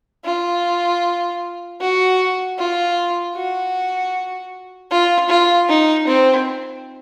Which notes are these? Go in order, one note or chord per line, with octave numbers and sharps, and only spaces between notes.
F4
F#4
F4
F#4
F4
F4
D#4
C4